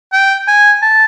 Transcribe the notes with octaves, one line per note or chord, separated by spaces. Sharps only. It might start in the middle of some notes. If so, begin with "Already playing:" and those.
G5
G#5
A5